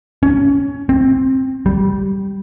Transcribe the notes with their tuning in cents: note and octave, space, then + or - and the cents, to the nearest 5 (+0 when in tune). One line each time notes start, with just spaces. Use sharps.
C#4 +15
C4 +15
G3 -10